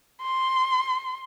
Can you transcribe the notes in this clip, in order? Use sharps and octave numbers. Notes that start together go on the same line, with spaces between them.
C6